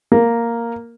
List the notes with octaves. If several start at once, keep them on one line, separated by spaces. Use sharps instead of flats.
A#3